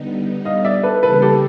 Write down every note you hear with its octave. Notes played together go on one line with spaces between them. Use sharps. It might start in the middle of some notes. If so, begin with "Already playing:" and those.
Already playing: D3 G3 B3 D#4
D#5 F5
D5 E5
A4 B4
C#3 E3 G3 A#3 A4 B4
G4 A4